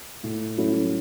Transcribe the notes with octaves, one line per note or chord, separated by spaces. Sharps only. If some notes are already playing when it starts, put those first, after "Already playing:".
A2
F#3 A3 C#4 E4